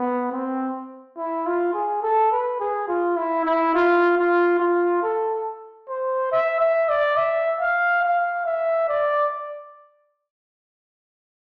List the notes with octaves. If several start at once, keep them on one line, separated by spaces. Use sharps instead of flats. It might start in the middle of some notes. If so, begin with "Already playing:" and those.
Already playing: B3
C4
E4
F4
G#4
A4
B4
G#4
F4
E4
E4
F4
F4
F4
A4
C5
E5
E5
D5
E5
F5
F5
E5
D5